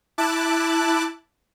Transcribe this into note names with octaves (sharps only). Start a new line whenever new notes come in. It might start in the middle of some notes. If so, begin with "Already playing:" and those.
E4 A5 D6 F#6